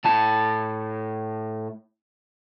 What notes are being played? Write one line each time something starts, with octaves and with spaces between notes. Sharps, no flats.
A2 A5